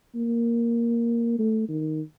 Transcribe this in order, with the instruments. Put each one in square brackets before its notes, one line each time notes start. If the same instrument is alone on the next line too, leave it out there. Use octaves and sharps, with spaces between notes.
[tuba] A#3
A3
D#3